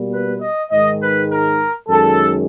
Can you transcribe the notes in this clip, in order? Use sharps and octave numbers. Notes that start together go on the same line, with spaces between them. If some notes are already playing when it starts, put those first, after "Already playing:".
Already playing: B2 G3 A#3
B4
D#5
G#2 D#3 G#3 D#5
B4
A#4
F#2 D#3 G#3 A4